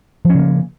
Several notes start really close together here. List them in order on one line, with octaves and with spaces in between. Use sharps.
F3 C#4 C#3 A#3